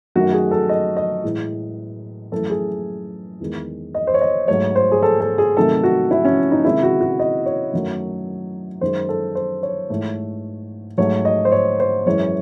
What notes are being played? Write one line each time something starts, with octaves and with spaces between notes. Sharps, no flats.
F#2 D#3 A3 F#4
G#4
A4
D#5
D#5
A2 E3 G#3
F#2 E3 A3 A4
G#4
E2 D#3 G#3
D#5
C5
C#5
D#5
G#2 F#3 A3 C#5
C5
G#4
A4
A4
G#4
C3 D#3 F#3 A3 A4
F#4
E4
C#4
D#4
C3 D#3 G#3 E4
F#4
F#4
D#5
C#5
F#2 D#3 F#3 A3
F#2 D#3 G#3 C5
A4
C5
C#5
G#2 E3 A3
G#2 F#3 A3 C#5
D#5
C5
C#5
C5
F#2 E3 G#3 C#5